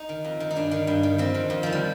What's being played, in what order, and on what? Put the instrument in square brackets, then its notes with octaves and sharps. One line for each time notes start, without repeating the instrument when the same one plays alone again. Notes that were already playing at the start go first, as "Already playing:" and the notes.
Already playing: [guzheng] D#4
D#3
F2
D#3
D#4
G2 D4
D#3
G2
D#3
F2 C4
D#3
F2
D#3 F3
G3